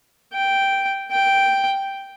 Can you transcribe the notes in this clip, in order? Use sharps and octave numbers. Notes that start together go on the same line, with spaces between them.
G5
G5